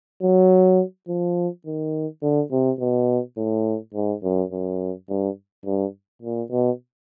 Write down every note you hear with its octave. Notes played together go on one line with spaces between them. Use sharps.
F#3
F3
D#3
D3
C3
B2
A2
G#2
F#2
F#2
G2
G2
A#2
B2